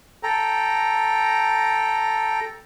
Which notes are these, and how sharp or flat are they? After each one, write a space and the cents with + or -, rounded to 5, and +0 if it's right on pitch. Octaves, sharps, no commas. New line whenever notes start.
A4 +0 G5 +0 A#5 +0